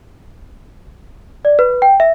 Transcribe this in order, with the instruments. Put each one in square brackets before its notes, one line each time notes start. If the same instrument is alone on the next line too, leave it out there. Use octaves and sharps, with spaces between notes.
[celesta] D5
B4
G5
E5